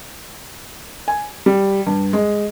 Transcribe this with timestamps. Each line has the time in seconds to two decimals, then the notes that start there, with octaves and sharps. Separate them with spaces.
1.08 G#5
1.46 G3
1.87 G2
2.13 G#3